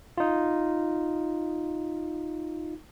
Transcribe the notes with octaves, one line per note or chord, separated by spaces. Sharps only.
D#4 F4